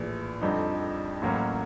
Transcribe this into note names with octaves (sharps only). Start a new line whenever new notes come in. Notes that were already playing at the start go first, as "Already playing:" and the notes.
Already playing: A#1 A2 E3
F2 D3 G3 C4 D#4
A1 A2 F#3 A#3 C#4